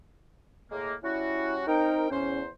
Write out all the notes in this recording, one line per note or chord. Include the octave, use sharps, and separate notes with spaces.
A2 G#3 A#3
G3 C#4 E4 F#4
C4 D#4 A#4 G5
E2 C#4 C5